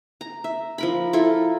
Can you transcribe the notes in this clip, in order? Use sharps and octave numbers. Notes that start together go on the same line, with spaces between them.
A#5
E5
F3 A#4 B5
E4 F4 A4 A#4